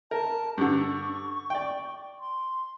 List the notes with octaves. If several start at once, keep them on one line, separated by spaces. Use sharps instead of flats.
A#4 A5
G2 D3 C#6
D5 G5
C6